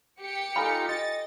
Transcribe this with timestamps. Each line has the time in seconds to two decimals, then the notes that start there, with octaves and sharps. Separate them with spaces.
0.19 G4 C#7
0.56 D#4 F4 A4 G#5 B5
0.89 D#5 A6